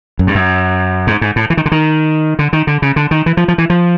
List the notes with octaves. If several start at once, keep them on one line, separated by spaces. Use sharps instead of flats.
F#2
G2
F#2
G#2
G#2
A2
E3
D#3
D3
D#3
D3
D#3
D3
C#3
D3
D#3
E3
F3
F3
E3
F3